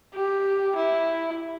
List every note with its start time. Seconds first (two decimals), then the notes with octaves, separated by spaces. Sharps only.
0.14 G4
0.76 E4